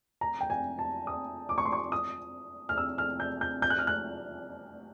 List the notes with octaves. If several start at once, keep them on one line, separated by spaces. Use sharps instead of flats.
A#5
G5
G#5
A5
D#6
D6
C#6
C6
C#6
D#6
F6
E6
F6
G6
G6
G6
F#6
F6
F#6